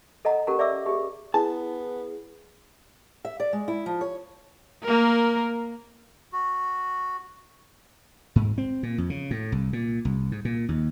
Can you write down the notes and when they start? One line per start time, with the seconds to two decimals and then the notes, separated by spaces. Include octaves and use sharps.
0.25 A4 D#5 F#5 A#5
0.47 C#4 G4 A4 A#4 F#5 A#5
0.59 D5 E5 D6 E6
0.86 G4 G#4
1.34 B3 E4 G#4 A5
3.25 E5
3.40 D5
3.53 G#3
3.68 E4
3.86 F3
4.01 C#5
4.83 A#3 A#4
6.33 F#4
8.36 G#2
8.58 C4
8.83 A#2
8.98 F2
9.10 C#3
9.31 A2
9.52 C2
9.73 A#2
10.05 C2
10.31 G#2
10.45 A#2
10.69 D#2